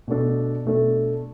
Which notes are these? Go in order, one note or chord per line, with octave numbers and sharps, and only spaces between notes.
B2 A3 D4 A4
B2 A3 D4 A4